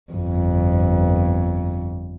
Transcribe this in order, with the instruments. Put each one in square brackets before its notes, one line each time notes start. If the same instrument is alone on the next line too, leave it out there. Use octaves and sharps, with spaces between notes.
[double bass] G1 F2